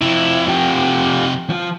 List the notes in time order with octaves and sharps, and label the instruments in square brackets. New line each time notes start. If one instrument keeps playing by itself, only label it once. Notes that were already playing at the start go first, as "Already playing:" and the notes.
[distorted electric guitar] F2 C3 [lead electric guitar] E4
[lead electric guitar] F4 G4
F3 F4